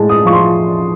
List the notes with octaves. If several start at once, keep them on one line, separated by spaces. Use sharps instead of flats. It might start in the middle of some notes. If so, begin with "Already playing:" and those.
Already playing: A2 G#3 A5
D#6
F3 C#6
C6